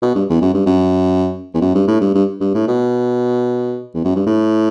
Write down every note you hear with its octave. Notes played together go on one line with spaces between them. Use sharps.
B2
G2
E2
F#2
G2
F#2
E2
F#2
G2
A2
G2
G2
G2
A2
B2
E2
F#2
G2
A2